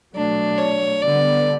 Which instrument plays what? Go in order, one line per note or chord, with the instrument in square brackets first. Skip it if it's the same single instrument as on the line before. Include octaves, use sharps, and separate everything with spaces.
[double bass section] B2 F#3 A3 [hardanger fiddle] D4
[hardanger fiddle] C#5
[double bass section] D3 G3 B3 [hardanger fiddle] D5